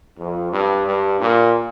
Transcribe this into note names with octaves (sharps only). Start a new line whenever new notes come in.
F2
G2
G2
A#2